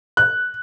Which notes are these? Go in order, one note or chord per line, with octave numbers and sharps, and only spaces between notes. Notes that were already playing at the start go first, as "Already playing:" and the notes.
F#6